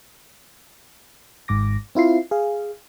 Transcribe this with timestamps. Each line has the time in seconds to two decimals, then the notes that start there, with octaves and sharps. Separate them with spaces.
1.48 G#1 G#2 D6 A#6
1.95 C4 E4 F4 C7
2.31 G#4 F5